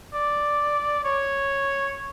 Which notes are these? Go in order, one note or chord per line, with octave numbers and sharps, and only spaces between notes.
D5
C#5